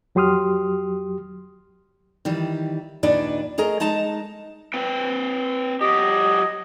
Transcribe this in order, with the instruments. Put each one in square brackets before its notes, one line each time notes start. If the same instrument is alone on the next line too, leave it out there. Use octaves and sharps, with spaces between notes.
[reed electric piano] F2 F#3 G4 C6 D#6 F6
[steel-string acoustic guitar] D#3 E3 G3
D#2 A#2 D4 D#4 B4 D5
A3 G#4 A#4 D#5 A#5
G#3 D#4 D#5 A5 A#5
[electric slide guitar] C4 B4 G5
[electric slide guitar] F#3 G4 [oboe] D#5